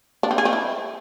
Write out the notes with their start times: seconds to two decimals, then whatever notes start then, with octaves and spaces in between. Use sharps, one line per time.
0.23 D4
0.31 C4
0.38 G#4
0.45 C4
0.53 E4